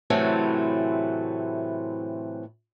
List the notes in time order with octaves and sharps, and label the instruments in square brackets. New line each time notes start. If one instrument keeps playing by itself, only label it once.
[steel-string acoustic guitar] A2 C3 E3 F#3 A3 C4